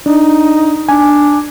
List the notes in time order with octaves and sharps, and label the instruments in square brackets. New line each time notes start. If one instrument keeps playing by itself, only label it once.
[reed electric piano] D4 [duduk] D#4
[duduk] D4 [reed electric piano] G#5